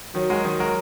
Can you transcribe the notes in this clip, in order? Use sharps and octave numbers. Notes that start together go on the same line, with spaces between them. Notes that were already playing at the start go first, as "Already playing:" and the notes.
D#3 F#3
G#3 F#4 A#4
D#3 F#3
G#3 F#4 A#4